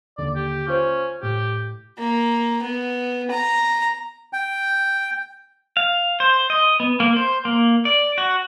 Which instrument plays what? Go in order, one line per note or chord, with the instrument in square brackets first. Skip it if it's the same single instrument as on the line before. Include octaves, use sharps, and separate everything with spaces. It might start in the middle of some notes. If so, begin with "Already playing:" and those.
[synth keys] D#2 D3 [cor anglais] D5
[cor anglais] G4
[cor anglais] C#4 [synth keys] F4 C5
[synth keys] A2 [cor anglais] G4
[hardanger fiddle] A#3
B3
A#5
[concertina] G5
[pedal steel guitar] F5
C5
D#5
B3
A#3
C5
A#3
D5
F#4